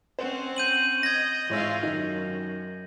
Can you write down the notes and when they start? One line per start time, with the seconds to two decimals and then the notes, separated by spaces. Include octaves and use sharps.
0.19 C4 C#4 C5 F#5
0.56 G6 D#7 F#7
1.03 D#5 G#6 A#6
1.49 G#2 E3 F4 C#5 E5
1.83 F#2 D#3 D#4